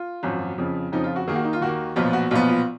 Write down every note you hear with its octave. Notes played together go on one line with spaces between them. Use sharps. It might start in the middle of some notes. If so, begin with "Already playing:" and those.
Already playing: F4
G#1 F#2 F3
F2 C#3 F3
F2 C#3 F3 D#4
F4
F#4
D#2 D#3 A#3 G#4
F#4
D#4
F4
D#2 D#3 A#3 F#4
B1 A#2 F3 B3 F4
F#4
B1 A#2 F3 B3 F4
F4